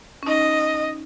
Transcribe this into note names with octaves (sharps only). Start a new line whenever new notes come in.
C#4
D#4 D#5